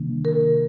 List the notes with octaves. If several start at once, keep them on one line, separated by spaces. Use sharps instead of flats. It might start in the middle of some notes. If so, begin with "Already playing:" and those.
Already playing: C3 D#3 G3 A#3 D4
A#4